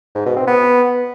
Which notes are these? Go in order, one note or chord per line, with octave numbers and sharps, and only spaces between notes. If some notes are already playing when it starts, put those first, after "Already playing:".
G#2
B2
C4
B3